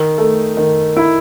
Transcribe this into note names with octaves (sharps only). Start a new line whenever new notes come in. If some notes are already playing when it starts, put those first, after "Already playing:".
Already playing: D#3
A3
D#3
E4